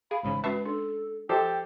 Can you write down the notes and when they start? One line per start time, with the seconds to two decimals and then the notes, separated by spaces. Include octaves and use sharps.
0.11 G#4 F5 B5
0.23 A1 G#2 C#3 B5
0.44 G#3 C#4 F#4 B4 E5 A5 C#6
0.66 D4 A4
1.29 F3 G4 A4 C5 G5